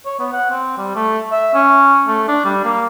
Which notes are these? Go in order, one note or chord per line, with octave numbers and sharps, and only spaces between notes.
C#5
B3
F#5
C4
G3
A3
E5
C#4
A3
D4
G3
A#3